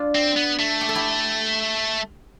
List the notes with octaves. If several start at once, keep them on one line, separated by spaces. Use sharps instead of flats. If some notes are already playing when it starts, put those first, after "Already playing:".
Already playing: D4 F4
C4
B3
A3
G4
A4
E4 G4